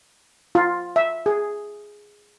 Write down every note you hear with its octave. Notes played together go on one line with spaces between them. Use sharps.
F4
E5
G#4